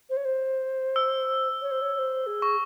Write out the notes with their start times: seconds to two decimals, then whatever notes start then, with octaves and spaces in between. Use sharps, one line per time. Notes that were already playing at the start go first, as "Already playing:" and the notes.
0.10 C5
0.17 C#5
0.25 C5
0.96 E6
1.62 C#5
1.71 C5
1.81 C#5
1.94 C#5
1.99 C5
2.27 G#4
2.42 C#6